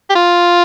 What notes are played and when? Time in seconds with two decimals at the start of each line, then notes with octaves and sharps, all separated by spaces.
0.10 G4
0.15 F4